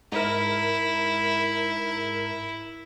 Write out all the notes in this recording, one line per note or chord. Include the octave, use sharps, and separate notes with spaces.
G#2 E4 A#4